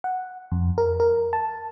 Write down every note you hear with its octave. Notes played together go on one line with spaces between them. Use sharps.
F#5
F2
A#4
A#4
A5